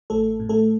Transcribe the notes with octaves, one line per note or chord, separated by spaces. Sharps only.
A1 A3 A4
A2
A3 A4